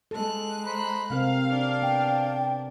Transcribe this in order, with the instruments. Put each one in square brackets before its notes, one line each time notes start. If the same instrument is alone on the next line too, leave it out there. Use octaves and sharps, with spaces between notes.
[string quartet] G#3 F#6 [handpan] A4
[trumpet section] C5 A#5 B5
[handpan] C3 C4 A#4 [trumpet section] F5
[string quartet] D4
[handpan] B3 [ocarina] G5